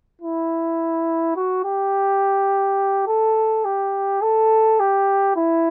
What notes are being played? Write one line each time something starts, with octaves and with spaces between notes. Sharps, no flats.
E4
F#4
G4
A4
G4
A4
G4
E4